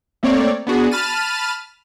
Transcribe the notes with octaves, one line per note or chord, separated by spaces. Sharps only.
A3 A#3 C4 C#5 D5
B3 D4 F#4 G#4
A5 B5 F6 A6 D#7